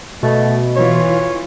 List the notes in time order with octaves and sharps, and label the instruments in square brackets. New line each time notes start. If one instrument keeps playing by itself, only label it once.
[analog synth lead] B2 [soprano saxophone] A3
[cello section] E3 F4 [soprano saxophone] C#5